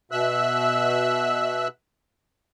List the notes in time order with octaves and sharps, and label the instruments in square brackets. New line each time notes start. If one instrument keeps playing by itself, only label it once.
[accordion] B2 E5 E6 F#6